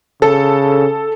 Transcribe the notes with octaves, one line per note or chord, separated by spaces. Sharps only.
C#3 A4